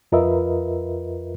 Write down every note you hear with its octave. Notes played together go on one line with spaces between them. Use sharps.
F2 F4 A#4 B4 D#5 E5